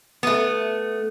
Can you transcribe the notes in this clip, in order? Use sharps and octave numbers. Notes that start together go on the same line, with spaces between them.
A3 B3